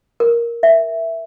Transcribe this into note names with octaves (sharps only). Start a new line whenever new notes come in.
A#4
E5